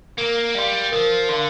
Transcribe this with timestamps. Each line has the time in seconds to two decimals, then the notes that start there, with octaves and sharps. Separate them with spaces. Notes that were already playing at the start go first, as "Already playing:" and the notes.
0.18 A#3 A#4
0.55 G3 F5 C6
0.92 F3 A#4
1.29 D3 F5 C6